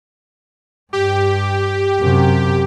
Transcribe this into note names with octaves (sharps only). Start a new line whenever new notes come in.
G2 G4
F#2 C3